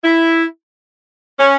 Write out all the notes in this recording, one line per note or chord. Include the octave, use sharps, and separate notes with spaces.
E4
C#4